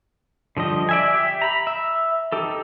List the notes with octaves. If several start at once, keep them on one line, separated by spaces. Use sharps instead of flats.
D3 F3 G3 D#5
D5 E5 G#5
G4 E5
A#5 B5
E5
D#4 G4 A4